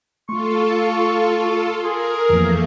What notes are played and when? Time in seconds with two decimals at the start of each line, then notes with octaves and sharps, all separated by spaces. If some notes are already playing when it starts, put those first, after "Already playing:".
0.29 A3 F4 A4 C6 C#6
1.85 G#4 A#4 C6
2.29 F2 E3 F3 A3 A#3